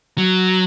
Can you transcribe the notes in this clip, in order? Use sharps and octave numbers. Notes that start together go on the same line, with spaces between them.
F#3